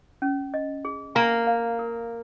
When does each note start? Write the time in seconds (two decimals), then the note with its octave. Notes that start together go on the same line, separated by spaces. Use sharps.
0.22 C#4
0.54 D#5
0.85 G#4
1.15 A#3 G#5
1.47 F5
1.79 A#4